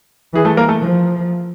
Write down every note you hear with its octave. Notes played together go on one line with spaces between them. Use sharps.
E3 G#4
A3 A4
A#3 A#4
A3 A4
F3